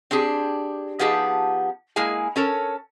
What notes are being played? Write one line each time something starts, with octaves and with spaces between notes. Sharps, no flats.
C4 D4 G4 G#4
F3 B3 D#4 G4 G#4 A5
G#3 A#3 E4 G#4 G#5
C#4 A4 A#4 C#5